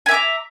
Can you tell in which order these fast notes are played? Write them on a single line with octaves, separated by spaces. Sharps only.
G#5 E5 D6 A#5